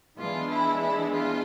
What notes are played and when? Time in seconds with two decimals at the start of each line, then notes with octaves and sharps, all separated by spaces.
0.19 E3 G#3 B3 D4 F4
0.51 E4
0.81 E4
1.13 F4